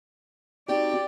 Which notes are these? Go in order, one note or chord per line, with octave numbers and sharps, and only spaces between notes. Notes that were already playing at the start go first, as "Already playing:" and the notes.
C4 D#4 F#4 G4 D5